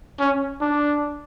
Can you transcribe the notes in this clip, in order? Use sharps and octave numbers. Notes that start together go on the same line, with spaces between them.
C#4
D4